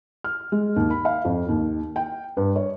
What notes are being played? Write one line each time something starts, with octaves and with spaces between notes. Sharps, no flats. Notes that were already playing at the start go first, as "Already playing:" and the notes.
F6
G#3
D#2
B5
F5
F2
D#2
G5
G2
C#5